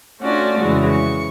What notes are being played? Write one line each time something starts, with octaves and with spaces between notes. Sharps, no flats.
A3 C#4 D4 F4 F#4 D5
F2 C#3 E3 G#3 F#4
C#6